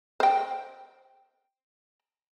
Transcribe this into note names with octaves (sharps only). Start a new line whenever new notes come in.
C5 G5